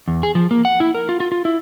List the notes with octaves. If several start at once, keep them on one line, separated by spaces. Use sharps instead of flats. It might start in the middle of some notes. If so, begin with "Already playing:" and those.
E2
G#4
F3
A#3
F#5
E4
A#4
F4
F4
F4
E4